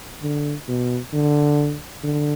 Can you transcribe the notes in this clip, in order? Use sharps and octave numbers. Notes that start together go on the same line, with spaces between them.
D3
B2
D3
D3